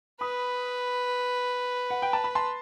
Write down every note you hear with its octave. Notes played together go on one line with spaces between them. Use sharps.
B4 B5 D#6
F#5
G5
A5
B5
A5 C6